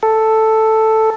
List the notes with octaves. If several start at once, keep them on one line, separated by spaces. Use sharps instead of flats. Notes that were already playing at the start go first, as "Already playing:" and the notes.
A4